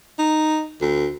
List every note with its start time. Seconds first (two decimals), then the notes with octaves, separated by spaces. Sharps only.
0.19 D#4
0.82 D2